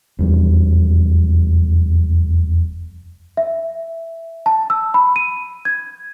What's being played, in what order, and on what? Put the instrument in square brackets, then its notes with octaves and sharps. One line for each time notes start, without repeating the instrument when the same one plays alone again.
[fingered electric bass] F1 E2 G3 D4
[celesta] E5
A5
E6
B5
D#7
G#6